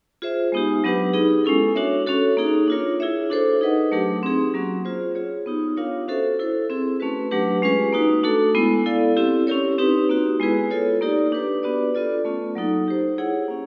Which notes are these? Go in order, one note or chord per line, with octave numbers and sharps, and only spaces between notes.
F4 G#4 C5 E5
G#3 B3 D#4 G4
F#3 B3 D4 G4 B4
B3 D#4 G#4
G#3 C#4 E4 A4
D4 F#4 A#4 C#5 E5
C#4 F#4 A4 C#5
A#3 D#4 G#4
D4 F4 A#4 C#5
E4 G#4 C#5 E5
D4 F#4 A4 C5
D#4 G#4 B4 D#5 F#5
F#3 A3 D4 G4 A#4
C4 D#4 G#4
F#3 A#3 C#4 F#4
F4 G#4 C5
F4 G#4 C#5
B3 D#4 G4
D4 F4 A#4 C#5 F5
C#4 F#4 A4 C5 E5
E4 A4 C5
C4 E4 G#4
A3 C#4 F#4 B4
F#3 A3 D4 G4 B4
G#3 C#4 F4 G#4 B4
A#3 D#4 F#4 B4
A3 D4 F#4 A4
G#3 B3 E4
E4 A4 D5 F5
C4 E4 G4
C#4 E4 G4 A#4 C#5
C4 D#4 G4 B4
A#3 D#4 F#4
G#3 B3 E4 G#4 B4
F4 A4 C#5
A#3 D#4 G4 A#4 D5
D4 G4 B4
B3 D4 F#4 B4 D5
B3 D4 F4 A4 D5
A3 C#4 F4
F#3 A#3 D#4 F#4 A4
D#4 G4 C5
E4 G#4 C#5 F#5
A#3 C#4